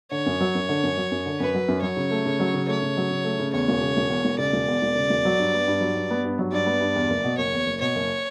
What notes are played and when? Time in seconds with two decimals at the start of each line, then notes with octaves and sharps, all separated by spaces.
0.11 D3 C#5
0.26 F#2
0.41 F#3
0.55 F#2
0.69 D3
0.83 F#2
0.98 F#3
1.12 F#2
1.26 D3
1.40 F#2 B4
1.54 F#3
1.68 F#2
1.82 F#3 C#5
1.97 C#3
2.11 A3
2.26 C#3
2.40 F#3
2.54 C#3
2.68 A3 C#5
2.82 C#3
2.97 F#3
3.11 C#3
3.24 A3
3.40 C#3
3.53 E2 C#5
3.68 E1
3.81 C#3
3.97 E1
4.10 E2
4.25 E1
4.38 C#3 D5
4.53 E1
4.68 E2
4.82 E1
4.96 C#3
5.10 E1
5.25 F#3
5.39 G2
5.54 B3
5.68 G2
5.81 F#3
5.95 G2
6.11 B3
6.25 G2
6.39 F#3
6.52 G2 D5
6.66 B3
6.81 G2
6.96 E2
7.10 F#1
7.24 B2
7.38 F#1 C#5
7.53 E2
7.66 F#1
7.81 B2 C#5
7.96 F#1